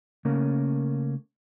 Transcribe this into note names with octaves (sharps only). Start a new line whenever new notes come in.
C#3 A3 A#3 C#4 A#4